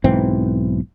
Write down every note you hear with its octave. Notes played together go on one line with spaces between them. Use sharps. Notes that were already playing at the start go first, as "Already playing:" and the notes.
B1 G#2 E3 C4